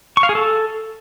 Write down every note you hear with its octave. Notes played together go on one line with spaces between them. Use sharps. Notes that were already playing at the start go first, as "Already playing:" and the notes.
C#6
F5
G#4
A4